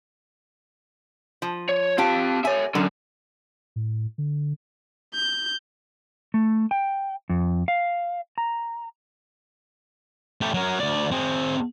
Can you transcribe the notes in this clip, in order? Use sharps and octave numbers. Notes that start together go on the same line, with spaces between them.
F3
C#5
C4 F4 G4 A5
C#5 E5 G#5
D3 F#3 C#4
A2
D3
G6
A3
G5
F2
F5
A#5
A3 G4
F#3 A#4
D2 D5
C4 G#4